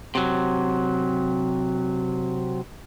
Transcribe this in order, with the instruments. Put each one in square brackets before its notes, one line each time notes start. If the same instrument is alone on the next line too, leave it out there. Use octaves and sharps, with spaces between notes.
[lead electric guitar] C3 F#3